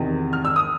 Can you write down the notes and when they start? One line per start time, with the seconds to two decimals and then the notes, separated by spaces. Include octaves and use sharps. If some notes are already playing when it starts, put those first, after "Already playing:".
Already playing: E2 C3 D#3
0.33 F6
0.45 E6
0.56 D#6